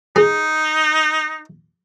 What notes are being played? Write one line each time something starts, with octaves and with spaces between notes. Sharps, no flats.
D#4 G#4